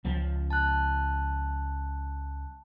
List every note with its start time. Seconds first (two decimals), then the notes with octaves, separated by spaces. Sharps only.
0.05 C#2 F3
0.50 A5 F#6